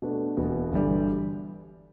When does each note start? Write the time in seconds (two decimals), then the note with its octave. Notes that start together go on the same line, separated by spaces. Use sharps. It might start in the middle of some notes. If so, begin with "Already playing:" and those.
0.02 B2 A3 D4 B4
0.37 E1 E2 B2 B3
0.72 G1 G2 E3 G3